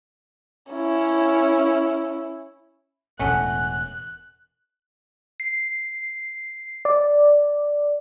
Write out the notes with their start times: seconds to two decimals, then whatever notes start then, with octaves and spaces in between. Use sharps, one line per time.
0.72 C#4 E4
3.19 E1 A2 A3 C#4 F#4 F#6
5.40 C7
6.85 D5